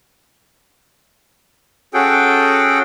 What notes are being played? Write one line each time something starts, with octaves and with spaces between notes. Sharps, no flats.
C#4 F#4 G#4 A4 G5